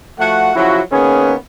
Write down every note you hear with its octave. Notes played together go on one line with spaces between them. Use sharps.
F3 A3 F#4 F#5
C#3 F3 F#3 E4 F#4
D#3 A#3 B3 C#4 G#4 B4